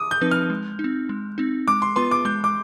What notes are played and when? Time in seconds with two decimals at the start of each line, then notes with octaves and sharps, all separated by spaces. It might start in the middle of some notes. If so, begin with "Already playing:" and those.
Already playing: D6 D#6
0.11 G6
0.21 F3 C4 D#4 B4
0.31 F6
0.50 G#3
0.79 D#4
0.84 C4
1.09 G#3
1.38 C4 D#4
1.68 G#3 D6
1.82 C6
1.96 B3 F4 B4 C6
2.11 D6
2.25 G#3 G6
2.44 D6